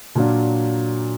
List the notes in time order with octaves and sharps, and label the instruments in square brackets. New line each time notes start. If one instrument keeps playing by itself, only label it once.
[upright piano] A#2 F#3 D4 F4